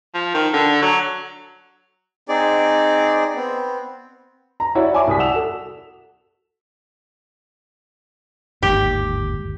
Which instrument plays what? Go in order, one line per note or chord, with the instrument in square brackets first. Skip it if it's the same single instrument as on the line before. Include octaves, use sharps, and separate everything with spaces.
[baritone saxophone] F3
D#3
D3
F#3
[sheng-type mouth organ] C4 D#4 G#4 D5
B3 C4
[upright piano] A#5
E4 F#4 C#5 D5
E5 G#5 C#6 D6
C2 D5 D#6 B6
F#5 E6 E7 F7
F#4 A4
[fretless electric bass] G1 D#2 G#2 [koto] G4